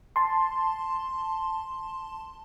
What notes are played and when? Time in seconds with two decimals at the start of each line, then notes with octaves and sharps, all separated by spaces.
0.16 A5 C6